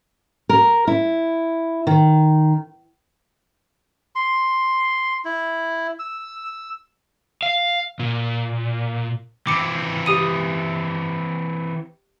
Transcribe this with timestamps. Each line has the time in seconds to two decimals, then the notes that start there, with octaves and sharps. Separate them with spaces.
0.49 A#4
0.87 E4
1.87 D#3
4.15 C6
5.25 E4
5.99 E6
7.43 F5
7.99 A#2
9.47 E3 C4 D6 C#7
10.06 G4 D#6 D#7